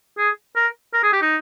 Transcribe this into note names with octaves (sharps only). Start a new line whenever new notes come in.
G#4
A#4
A#4
G#4
G4
D#4